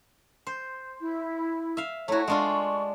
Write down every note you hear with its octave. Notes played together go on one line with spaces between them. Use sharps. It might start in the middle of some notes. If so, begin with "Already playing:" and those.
C5
E4
E5 F5
A3 E4 F#4 C#5 A#5
G#3 D4 F4 C#6